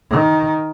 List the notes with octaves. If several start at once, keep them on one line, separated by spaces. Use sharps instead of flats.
D#3